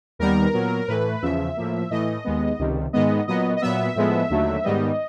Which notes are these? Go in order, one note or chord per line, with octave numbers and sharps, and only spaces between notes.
D#2 D#3 G3 B3 A#4
A#2 F#3 B3
A2 E3 A3 B4
E2 C#3 F3 E5
A2 F3 A#3
A2 E3 A3 D#5
D#2 D#3 G#3 B3
C#2 C3 D#3 G3
G#2 D#3 G#3 B3 D#5
A#2 F#3 B3 D#5
D#5
A#2 F#3 B3 E5
A2 F3 G#3 B3
D#2 D3 F#3 A3
G#2 D#3 G3 B3 D#5